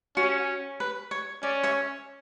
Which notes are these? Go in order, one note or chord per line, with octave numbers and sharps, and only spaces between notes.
C#4 F#4
B4
C#5
C#4 D5
C#5 E5